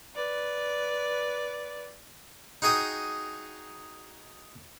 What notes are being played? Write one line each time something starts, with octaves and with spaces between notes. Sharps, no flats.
B4 D5
D#4 F#4 G#4 G5 D#6